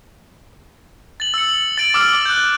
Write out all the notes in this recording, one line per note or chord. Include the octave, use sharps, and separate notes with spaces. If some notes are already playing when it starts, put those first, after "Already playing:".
A6 F#7
E6 C#7
A6 D7 F#7
D6 E6 F6
F#6 G6